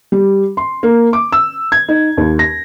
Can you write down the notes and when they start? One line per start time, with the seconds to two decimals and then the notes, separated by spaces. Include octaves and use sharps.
0.12 G3
0.57 C6
0.83 A#3
1.13 D6
1.32 E6
1.72 G#6
1.88 D#4
2.17 D#2
2.39 A#6